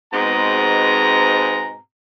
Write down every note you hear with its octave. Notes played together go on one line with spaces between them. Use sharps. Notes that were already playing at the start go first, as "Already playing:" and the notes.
G#2 B2 G#3 B3 C4 A#5